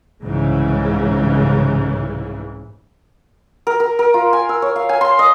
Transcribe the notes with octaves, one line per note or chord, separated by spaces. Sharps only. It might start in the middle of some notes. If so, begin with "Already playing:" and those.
C2 G#2 C#3 E3
A#4
A#4
A#4
F4
G#5
E6
C#5
F5
G#5
C6
D#5